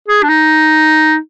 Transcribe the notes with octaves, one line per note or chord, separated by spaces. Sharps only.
G#4
D4
D#4